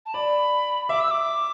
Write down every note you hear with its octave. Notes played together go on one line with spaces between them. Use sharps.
A5
D5 B5
E5 D6
E6
D6